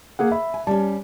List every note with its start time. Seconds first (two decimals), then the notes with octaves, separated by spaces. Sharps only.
0.19 A#3 G#4 F#5
0.31 E5 B5
0.54 G#5
0.67 G3 C#4 A5